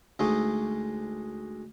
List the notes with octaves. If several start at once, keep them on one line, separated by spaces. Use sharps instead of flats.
D2 G#3 A3 D#4